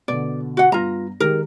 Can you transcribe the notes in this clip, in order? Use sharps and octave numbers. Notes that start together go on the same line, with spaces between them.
B2 D3 D5
F#4 F#5
G2 B3 F4 A#5 A#6
D#3 G#3 G4 A#4